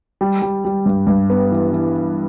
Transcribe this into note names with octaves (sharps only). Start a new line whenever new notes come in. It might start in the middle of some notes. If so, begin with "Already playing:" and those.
G3
G3
G3
G2
G2
B3
E3
E3